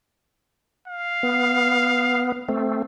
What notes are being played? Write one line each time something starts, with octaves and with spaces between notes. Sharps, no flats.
F5
B3
A3 C4